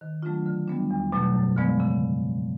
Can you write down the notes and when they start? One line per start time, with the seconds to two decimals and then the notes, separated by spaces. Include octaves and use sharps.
0.01 D#3
0.23 F#3 A3 D4 F4
0.46 D3
0.68 G3 B3 D4
0.91 E2
1.12 B2 F#3 A3
1.35 F#2
1.57 D3 F3 G#3 B3
1.80 C#3